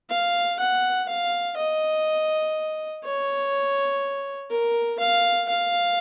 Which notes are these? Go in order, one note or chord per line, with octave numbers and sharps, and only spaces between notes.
F5
F#5
F5
D#5
C#5
A#4
F5
F5